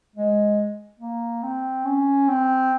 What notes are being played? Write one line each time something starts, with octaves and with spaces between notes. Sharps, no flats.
G#3
A#3
C4
C#4
C4